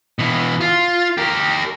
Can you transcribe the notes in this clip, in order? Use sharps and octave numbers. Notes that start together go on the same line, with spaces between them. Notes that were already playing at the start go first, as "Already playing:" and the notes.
B2 E3
F4
G4 A#4